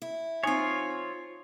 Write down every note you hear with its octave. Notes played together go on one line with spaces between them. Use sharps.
E4
F3 C4 D#4 F4 C#5 G#5